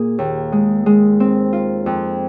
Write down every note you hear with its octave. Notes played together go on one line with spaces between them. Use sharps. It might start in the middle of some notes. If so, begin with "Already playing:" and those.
Already playing: A#2 G#4
D#2
G#3
G#3
C4
F4
F2